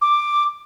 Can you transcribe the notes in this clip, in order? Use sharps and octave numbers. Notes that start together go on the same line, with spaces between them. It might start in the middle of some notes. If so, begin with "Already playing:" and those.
D6